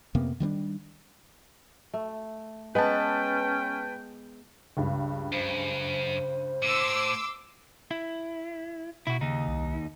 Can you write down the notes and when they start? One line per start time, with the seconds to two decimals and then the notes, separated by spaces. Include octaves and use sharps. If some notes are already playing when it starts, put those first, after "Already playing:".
0.15 F2 C3 A#3 B3
0.40 D#3 G3 A#3 D4
1.94 A3
2.75 G#3 B3 C#4 B4 G5 A5
4.77 C#2 G2
5.32 F#2 C5
6.63 A2 C6 D6 E6
7.91 E4
9.07 B2 E4 F#4
9.21 D#2 C#3 D#4
9.48 C2